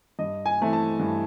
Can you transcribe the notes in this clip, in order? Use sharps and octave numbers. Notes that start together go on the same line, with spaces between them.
G2 D#5
G#5
E3 A3 C4
A5
G2